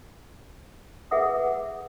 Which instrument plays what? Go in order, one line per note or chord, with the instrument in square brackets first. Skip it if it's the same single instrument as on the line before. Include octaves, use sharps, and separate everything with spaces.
[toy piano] G#4 B4 E5 F#5 D#6